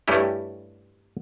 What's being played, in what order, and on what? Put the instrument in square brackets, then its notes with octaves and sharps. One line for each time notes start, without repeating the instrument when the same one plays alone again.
[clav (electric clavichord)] G2 A3 C#4 E4 G4